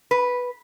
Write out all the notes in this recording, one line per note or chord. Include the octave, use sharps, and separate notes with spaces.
B4